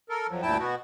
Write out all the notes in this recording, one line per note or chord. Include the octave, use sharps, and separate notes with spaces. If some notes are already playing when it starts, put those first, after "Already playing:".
A4 A#4
F2 F3 F#3
D2 G2 A#2 E4 G5 A5
B2 B3 F#4